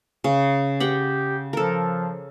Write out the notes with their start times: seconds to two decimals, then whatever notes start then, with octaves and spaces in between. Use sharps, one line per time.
0.24 C#3
0.80 G4 F#5 G5 B5
1.53 F3 A4 A#4